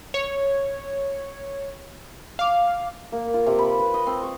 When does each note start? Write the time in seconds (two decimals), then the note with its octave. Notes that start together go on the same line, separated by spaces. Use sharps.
0.14 C#5
2.39 F5 D6
3.12 A#3
3.34 F4
3.46 C3
3.58 B5
3.79 B4
3.94 D#5
4.07 C4
4.23 C#6